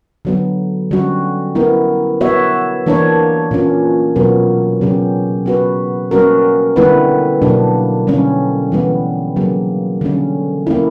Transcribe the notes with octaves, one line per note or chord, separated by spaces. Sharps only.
D3 F#3 B3
D3 G3 C#4 F#4
B3 E4 A#4
B3 F#4 C#5 E5
E3 A#3 D4 A#4 C#5
A#2 A#3 C#4
B2 F#3 B3 F#4 A#4
C#3 F#3 C#4 G4
B3 F#4 B4
G3 A#3 C#4 F#4 A#4
D3 G3 B3 E4 B4
B2 F#3 A#3 D4
D3 G3 C#4
E3 G3 B3
C#3 F#3 A#3
D3 G3 C#4
A#3 C#4 E4